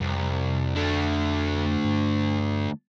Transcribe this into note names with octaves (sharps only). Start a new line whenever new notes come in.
C2 F2
D3 A3
G2